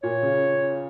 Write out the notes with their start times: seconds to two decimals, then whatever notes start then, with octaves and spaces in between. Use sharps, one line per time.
0.03 A#2 C#5
0.22 C#3